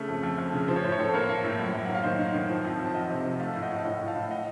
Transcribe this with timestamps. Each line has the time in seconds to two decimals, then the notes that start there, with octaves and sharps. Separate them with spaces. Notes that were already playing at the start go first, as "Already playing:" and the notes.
Already playing: C#3 A3 A4
0.08 F2
0.23 F2
0.38 F2
0.53 C#3
0.68 F3 C5
0.76 C#5
0.83 A2 C5
0.92 C#5
0.99 A2 A4 C5
1.13 A#3 A#4 C#5
1.29 A#3
1.44 A2
1.59 F#2
1.74 F#2
1.85 A#3 F#5
1.95 F5
2.03 D#3 C5 D#5
2.19 D#3
2.34 D#3
2.49 F3
2.64 F2
2.80 F2
2.86 A5
2.94 F2 D#5 F#5
3.10 C3
3.24 F3
3.40 A3 F5 A5
3.55 A2
3.62 D#5 F#5
3.70 A2
3.77 F5
3.85 A2 D#5 F#5
4.00 A2
4.07 F5 A5
4.15 A2
4.30 D#5 F#5